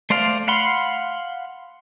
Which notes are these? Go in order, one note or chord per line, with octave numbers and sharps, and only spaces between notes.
A3 C5 D5 F5
F5 F#5 B5 C6